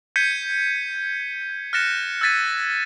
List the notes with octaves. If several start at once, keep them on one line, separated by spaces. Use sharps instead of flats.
G6 G#6 B6 C#7 D#7 G7
F6 F#6 A6 A#6 C#7 E7
E6 F6 G#6 A6 B6 D#7